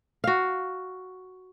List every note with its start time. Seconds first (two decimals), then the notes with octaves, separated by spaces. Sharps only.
0.24 F#4 F5